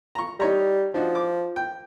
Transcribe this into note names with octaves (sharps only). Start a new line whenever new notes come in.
A#5 C#6
G3 D#4 C#5 A#5
F3 D4 D#4 F#4
D6
G5